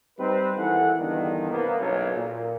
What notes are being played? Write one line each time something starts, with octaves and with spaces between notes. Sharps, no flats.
G3 C4 D#4 B4
G#1 E3 A4 F#5
E2 G2 D3 D#3
C2 A#3 B3
F#1 B1 C#5
A#2